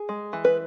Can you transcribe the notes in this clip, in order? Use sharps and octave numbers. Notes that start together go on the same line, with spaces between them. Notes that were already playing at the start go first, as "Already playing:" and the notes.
Already playing: G#4
G#3
E3
B4